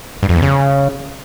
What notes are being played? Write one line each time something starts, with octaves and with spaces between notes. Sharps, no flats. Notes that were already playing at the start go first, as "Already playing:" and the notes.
G2
F2
E2
C#3